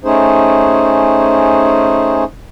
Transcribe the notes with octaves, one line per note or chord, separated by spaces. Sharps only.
A3 C#4 D#4 G#4 C5